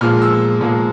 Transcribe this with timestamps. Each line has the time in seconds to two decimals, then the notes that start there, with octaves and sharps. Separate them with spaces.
0.01 A#2 F3 G#3 F6
0.22 E6
0.61 A#2 F3 G#3